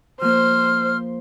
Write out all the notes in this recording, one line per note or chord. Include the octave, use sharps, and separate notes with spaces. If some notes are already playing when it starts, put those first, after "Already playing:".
F3 A#3 C5 F6